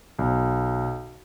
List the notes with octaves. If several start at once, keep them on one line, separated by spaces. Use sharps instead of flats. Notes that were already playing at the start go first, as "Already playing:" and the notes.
B1